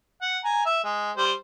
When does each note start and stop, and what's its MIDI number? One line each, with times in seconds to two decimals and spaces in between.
0.22 0.39 78
0.44 0.63 80
0.44 0.63 82
0.66 0.79 76
0.84 1.11 56
1.17 1.32 55
1.17 1.32 72